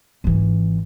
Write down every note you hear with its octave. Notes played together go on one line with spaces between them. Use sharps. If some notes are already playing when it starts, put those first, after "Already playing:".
G#1 E3